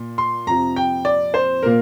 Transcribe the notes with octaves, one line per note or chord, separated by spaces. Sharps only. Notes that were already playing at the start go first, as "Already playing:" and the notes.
Already playing: A#2
C6
F2 C3 F3 A#5
G5
D5
C5
A#2 A#3 A#4